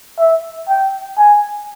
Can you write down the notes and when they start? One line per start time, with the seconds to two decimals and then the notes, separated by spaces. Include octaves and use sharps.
0.19 E5
0.69 G5
1.18 G#5